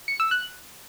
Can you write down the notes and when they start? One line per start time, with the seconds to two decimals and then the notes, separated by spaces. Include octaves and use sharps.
0.08 C#7
0.20 E6
0.31 F#6